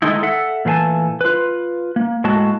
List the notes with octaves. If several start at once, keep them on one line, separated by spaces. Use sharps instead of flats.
D#3 G#3 A3 D#4 E4
A4 E5 F#5
A#2 E3 A3 F5 G#5 A5
F4 B4
A#3
A2 G#3 A#3 F#4 A5